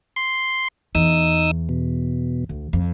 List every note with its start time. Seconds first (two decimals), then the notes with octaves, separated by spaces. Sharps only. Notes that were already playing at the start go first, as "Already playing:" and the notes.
0.16 C6
0.95 E2 D#4 D#6 E6
1.69 B2
2.49 D2
2.73 F2